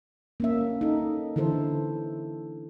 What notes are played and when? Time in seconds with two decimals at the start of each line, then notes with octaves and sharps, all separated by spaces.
0.40 A#3 C#4 E5
0.81 D#4 A4
1.36 D3 E3 E4 A4 C5